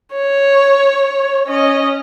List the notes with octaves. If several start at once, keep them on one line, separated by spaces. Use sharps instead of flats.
C#5
C#4 D#5